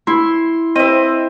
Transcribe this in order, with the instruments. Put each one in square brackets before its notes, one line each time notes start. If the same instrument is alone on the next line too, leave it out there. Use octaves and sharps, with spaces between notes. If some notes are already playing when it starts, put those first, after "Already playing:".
[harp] E4 [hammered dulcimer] C6
[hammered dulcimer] C4 E5 [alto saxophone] D#5